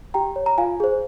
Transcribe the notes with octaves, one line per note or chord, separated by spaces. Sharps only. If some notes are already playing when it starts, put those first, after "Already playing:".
G4 G5 A#5
C#5
A#5
F4 F5 G#5
G#4 C5